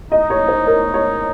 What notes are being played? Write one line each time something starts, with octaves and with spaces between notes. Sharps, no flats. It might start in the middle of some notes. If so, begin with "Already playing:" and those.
D#4 D#5
C#5
C5
A#4
C#5